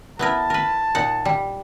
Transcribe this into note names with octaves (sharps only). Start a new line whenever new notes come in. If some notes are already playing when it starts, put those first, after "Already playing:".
B3 E4 A#4 A5
A#4 B4
A#2 D#4 F#5
G3